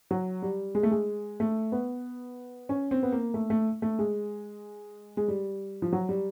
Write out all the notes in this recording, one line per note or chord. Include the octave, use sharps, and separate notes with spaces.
F#3
G3
G#3
A3
G#3
A3
B3
C#4
C4
B3
A#3
A3
A3
A3
G#3
G#3
G3
F3
F#3
G3